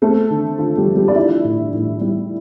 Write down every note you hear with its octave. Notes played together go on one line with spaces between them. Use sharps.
A3 C4 A4
D3
D3 F4
G3 G4
F3
G3 G4
D5
D4 E4 E5
A2
A2
G3